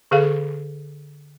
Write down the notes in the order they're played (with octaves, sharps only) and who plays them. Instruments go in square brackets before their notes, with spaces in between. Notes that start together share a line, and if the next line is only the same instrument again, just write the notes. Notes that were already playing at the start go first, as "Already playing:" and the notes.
[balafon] D3 G#4 A4 F5